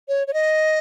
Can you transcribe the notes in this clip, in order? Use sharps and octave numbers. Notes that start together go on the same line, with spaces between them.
C#5
C#5
D#5